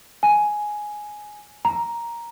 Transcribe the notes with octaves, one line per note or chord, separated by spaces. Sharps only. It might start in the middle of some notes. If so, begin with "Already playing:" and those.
G#5
A#5